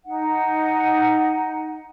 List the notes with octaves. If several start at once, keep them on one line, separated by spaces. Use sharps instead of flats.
D#4 F#5